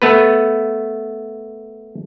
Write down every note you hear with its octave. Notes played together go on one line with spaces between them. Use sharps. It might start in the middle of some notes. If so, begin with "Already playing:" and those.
A3 B3 B4